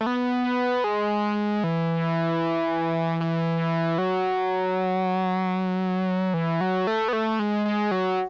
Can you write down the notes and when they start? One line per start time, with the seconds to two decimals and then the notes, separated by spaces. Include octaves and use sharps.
0.01 A3
0.06 B3
0.84 G#3
1.64 E3
3.21 E3
3.98 F#3
6.34 E3
6.61 F#3
6.87 A3
7.08 B3
7.13 A3
7.39 G#3
7.65 G#3
7.91 F#3